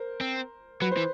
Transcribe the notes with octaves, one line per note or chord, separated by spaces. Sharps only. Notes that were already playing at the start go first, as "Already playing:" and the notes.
Already playing: A#4 C5
C4
F#3 B4
C5
E3